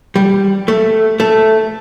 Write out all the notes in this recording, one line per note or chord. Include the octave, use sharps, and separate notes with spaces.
G3
A3
A3